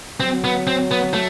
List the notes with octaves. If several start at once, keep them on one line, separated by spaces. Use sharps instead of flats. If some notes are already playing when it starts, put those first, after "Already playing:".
F#3 C4
B3
C4
B3
A3